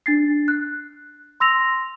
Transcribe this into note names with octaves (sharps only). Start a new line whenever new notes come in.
D4 A6 C7
F#6
C6 E6 A#6 F7